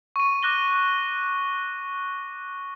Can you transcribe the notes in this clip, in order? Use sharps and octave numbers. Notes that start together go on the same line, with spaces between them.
C#6 D#7
D6 F#6 A#6 G7